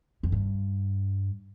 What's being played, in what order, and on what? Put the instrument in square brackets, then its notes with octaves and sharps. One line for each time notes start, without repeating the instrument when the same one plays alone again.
[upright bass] F2
G2